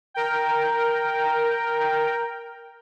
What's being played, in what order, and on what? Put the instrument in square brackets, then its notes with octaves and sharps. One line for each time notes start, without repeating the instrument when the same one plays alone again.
[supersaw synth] A#4 G5